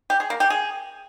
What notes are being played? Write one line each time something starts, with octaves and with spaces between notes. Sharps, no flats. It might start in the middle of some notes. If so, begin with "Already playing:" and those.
G4
G#4
A#3
G4
G#4